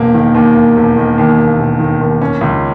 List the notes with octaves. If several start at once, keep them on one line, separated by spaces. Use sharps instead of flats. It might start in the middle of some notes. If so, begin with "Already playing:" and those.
Already playing: E1 A#3
D#3
D#2
A#3
E1
D#3
D#2
A#3
E1
D#3
D#2
C#4
C#2